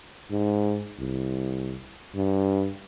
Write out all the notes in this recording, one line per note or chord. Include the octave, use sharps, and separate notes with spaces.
G#2
C2
G2